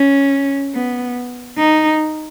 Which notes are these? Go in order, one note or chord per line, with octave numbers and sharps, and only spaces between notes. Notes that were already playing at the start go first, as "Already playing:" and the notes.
Already playing: C#4
B3
D#4